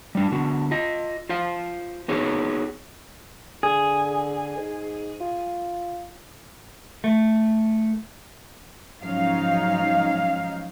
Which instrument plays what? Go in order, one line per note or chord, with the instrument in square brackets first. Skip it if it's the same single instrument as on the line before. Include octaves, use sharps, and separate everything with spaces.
[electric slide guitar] G3 D4
D3 B3 F#4
F4 D#5
F4 C5 F5
B3 D#4 F#4 G#4 B4 C#5
[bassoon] D3 [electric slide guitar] G#4
[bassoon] G#2
F4
[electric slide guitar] A3
[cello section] G#2 F3 F#3 C#4 D#4 F5